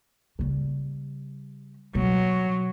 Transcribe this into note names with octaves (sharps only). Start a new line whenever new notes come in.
C#3 G3
B2 F#3